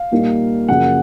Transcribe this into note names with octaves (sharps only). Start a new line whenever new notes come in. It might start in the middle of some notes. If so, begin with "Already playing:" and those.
Already playing: F5
A#2 G3 A#3 D#4
F#2 C#3 F3 A#3 F#5